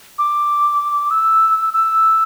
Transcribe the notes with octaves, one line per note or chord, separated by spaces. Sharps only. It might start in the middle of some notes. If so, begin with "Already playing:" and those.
D6
E6
E6